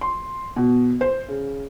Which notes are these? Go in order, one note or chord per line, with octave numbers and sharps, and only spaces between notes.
C6
B2
C5
C#3